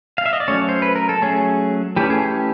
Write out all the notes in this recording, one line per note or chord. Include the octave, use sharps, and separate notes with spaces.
F5
E5
D#5
D5
F#3 A3 C#4 C#5
C5
B4
A#4
A4
F#3 A3 C#4 G#4
E3 A3 C#4 G4
G#4
G4